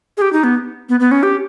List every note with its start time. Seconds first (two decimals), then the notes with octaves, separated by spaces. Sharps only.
0.17 G#4
0.22 G4
0.33 D#4
0.44 B3
0.89 B3
1.00 B3
1.11 C#4
1.23 G4